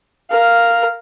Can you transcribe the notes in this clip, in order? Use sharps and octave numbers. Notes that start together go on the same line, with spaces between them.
A#4 F5